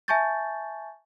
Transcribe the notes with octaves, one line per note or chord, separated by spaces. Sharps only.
E5 G#5 A5 C#6 G6 A6